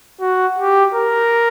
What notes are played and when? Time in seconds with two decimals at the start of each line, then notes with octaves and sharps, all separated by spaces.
0.20 F#4
0.58 G4
0.94 A#4